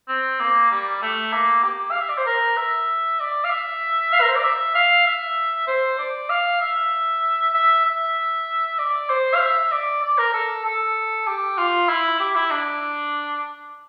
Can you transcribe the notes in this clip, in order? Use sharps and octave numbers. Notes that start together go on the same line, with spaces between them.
C4
A#3
G3
A3
A#3
G4
F5
E5
D5
C5
A#4
E5
D5
F5
E5
F5
A#4
C5
D5
E5
F5
E5
C5
D5
F5
E5
E5
E5
D5
C5
F5
E5
D5
D5
A#4
A4
A4
G4
F4
E4
G4
E4
D4